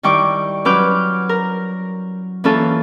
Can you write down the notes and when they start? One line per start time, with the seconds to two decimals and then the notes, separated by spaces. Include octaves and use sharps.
0.03 D#3 G3 E4 G5 C#6 D6
0.65 F#3 C#4 B4 D6 F6 G6
1.29 A#4
2.44 E3 A#3 C#4 F4 A4